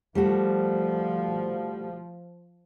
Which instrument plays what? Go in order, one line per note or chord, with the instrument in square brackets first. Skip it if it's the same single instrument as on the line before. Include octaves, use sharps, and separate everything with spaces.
[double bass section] F3 [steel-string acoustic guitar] G3 A3 F#4